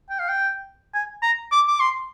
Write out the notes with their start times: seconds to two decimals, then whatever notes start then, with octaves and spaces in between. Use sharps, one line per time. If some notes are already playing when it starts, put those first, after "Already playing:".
0.10 G5
0.20 F5
0.29 G5
0.94 G#5
1.23 A#5
1.52 D6
1.68 D6
1.80 C6